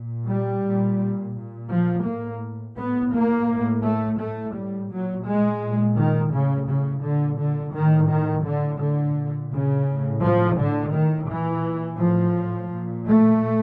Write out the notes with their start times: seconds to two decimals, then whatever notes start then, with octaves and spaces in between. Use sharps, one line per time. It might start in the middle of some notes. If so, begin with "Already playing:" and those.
Already playing: A#2
0.28 G3
0.64 A#2
1.36 A#2
1.70 F3
2.06 A2 A#3
2.78 A2 B3
3.13 A#3
3.49 A2
3.84 A3
4.20 A2 A3
4.55 G3
4.90 A#2 F#3
5.26 G#3
5.62 A#2
5.97 D#3
6.32 A2 C#3
6.68 C#3
7.03 A#2 D3
7.39 D3
7.74 A2 D#3
8.10 D#3
8.46 A2 D3
8.81 D3
9.17 A#2
9.52 C#3
9.87 A2
10.23 F3
10.58 A2 D3
10.94 D#3
11.29 A#2 E3
12.00 A2 F3
12.71 A#2
13.07 A3